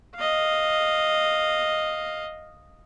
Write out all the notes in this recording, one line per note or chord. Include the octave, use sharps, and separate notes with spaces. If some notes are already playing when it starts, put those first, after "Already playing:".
D#5 F5